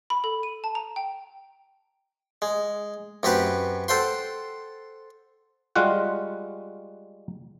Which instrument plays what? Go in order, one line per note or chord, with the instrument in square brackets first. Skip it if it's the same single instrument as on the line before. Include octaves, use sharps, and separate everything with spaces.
[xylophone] B5
A4
D#7
A5
A#5
G5
[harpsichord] G#3
F#2 C4 G4 B4 F#5
A4 C5 F#5 G5 C6
[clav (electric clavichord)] G3 G#3 F4 F#4 F#5